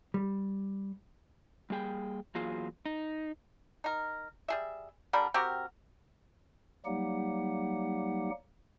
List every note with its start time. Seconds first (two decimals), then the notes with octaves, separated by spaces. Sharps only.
0.14 G3
1.70 G3 A#3 G#4 G5
2.35 E2 F#3 A#3 F4 G#4 F5
2.86 D#4
3.84 D#4 A#4
4.48 G3 G#4 E5
5.13 D3 G3 A#4 B5
5.34 C4 F#4 G4 A#4
6.85 F#3 G3 A#3 D#4 G4 F#5